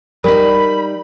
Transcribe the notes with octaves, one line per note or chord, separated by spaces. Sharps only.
G3 D#4 A#4 B5